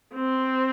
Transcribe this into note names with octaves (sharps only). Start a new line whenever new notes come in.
C4